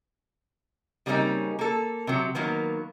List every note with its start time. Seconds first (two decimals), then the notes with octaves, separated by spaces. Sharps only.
1.06 C#3 G3 A#3 C4 C#4 D#4
1.59 A#3 A4
2.07 C3 F#3
2.35 D#3 F#3 A#3 B3